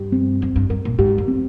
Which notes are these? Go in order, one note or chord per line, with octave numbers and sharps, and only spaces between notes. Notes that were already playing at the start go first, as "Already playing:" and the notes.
Already playing: G2 G4
C4
F2 C4
G2
G2 A#4
A#2
G#2 G4
F2
C4